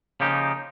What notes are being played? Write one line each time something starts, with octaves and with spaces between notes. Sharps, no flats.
C#3 F3 A#3 D#4 G4